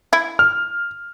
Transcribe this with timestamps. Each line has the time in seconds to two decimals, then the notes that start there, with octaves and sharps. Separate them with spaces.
0.13 E4
0.39 F6